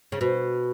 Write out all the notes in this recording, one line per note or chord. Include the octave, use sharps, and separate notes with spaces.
C#3
B2